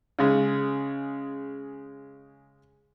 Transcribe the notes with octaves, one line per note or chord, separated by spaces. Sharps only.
C#3 G#3